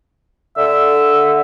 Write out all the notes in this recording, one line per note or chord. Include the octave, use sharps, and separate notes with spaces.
D3 E5